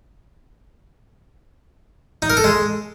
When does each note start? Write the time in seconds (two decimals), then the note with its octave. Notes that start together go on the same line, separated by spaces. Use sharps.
2.22 D#4
2.30 A#4
2.37 A4
2.44 G#3